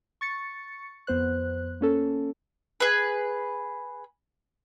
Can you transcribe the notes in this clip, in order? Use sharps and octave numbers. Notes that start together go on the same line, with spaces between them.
C#6 A6 C#7
F2 B3 C5 F#6
A#3 C#4 A4
G#4 B4